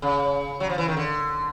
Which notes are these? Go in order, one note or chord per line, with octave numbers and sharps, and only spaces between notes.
C#3
F#3
F3
E3
D#3
D3